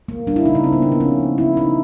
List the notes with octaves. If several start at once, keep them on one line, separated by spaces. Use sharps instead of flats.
A#3
G3 D4
E4
C#3 D#4
D4
C#3 C4
B3
C#3 A#3
B3
F3 C#4
C#3
C#3 E4
C#3 D#4